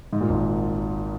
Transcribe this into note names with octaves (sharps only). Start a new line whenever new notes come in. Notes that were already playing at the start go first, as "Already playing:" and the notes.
G#2
A#2
G#1 G#2